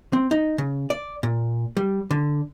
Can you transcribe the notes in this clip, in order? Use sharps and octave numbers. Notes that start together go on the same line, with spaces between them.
C4
D#4
C#3
D5
A#2
G3
D3